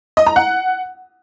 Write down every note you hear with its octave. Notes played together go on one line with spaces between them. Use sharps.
D#5
A#5
F#5